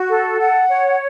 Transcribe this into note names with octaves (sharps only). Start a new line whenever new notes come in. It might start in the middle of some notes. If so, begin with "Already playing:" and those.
Already playing: F#4
A4
F#5
C#5